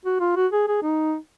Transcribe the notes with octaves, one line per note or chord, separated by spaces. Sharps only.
F#4
F4
F#4
G#4
G#4
D#4